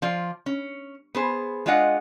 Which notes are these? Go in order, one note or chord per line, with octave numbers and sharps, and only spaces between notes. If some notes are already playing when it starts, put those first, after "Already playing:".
F3 F4 D5
C#4
B3 G#4 C5
G#3 D4 F4 D#5 F#5